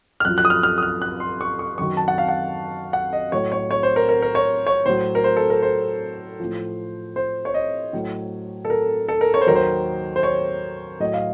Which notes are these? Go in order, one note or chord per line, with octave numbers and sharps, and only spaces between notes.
F6
F#2 F3 F#6
F#6
D#6
F6
F6
D#6
F6
F#6
C6
C#6
C#6
F#2 D#3 F#3 C#6
A5
F#5
F5
F#5
F#5
D#5
A2 F#3 C#5
C#5
C#5
C5
A#4
A#4
A#4
C#5
C#5
A2 F#3 C5
A#4
C5
A4
A#4
C5
A2 F3
C5
C#5
D#5
A2 F#3
A4
A#4
A4
A#4
C#5
C5
D#2 D#3 F#3 A#4
C5
C5
C#5
A2 F#3 D#5
F5